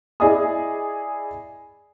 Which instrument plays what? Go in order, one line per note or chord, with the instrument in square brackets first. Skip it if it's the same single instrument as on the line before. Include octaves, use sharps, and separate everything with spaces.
[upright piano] E4 G#4 D5 D#5 G#5 D#6